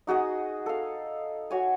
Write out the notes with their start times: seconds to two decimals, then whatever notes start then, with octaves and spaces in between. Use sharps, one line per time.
0.07 D#4 F#4 G#4 D#5
0.66 A4 F5
1.51 F#4 C#5 G#5